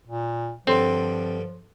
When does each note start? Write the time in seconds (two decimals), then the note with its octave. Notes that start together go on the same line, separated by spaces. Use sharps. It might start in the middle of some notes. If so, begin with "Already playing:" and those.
0.07 A#2
0.67 G2 D3 F3 C4 A4 C#5 C6